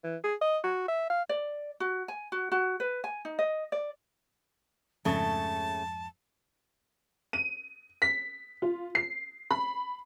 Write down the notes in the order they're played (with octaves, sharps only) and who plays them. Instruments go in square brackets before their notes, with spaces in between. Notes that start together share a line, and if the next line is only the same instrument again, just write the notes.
[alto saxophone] E3
G#4
D#5
F#4
E5
F5
[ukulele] D5
F#4
G#5
F#4
F#4
B4
G#5
D#4
D#5
D5
[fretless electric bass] F2 G#2 F3 [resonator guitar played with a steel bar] C#3 A3 [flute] A5
[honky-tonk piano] D#7
B6
F4
C7
B5